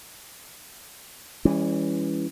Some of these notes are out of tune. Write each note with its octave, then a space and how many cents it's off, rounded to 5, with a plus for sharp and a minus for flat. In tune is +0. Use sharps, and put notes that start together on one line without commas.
E3 +0 G3 +45 C#4 +0